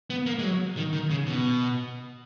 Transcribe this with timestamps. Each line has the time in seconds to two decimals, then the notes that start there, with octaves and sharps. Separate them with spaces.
0.10 B3
0.26 A#3
0.39 G#3
0.44 F#3
0.77 D#3
0.93 D#3
1.10 C#3
1.27 B2